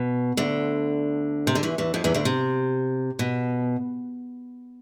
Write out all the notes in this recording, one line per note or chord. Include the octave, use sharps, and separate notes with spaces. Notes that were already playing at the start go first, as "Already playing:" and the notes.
Already playing: B2
D2 D3
C3
D3
E2 E3
E2 E3
F2 F3
E2 E3
D2 D3
C3
B2